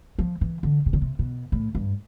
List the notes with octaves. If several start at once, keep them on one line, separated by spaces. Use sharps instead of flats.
F3
E3
D3
C3
D3
C3
B2
A2
G2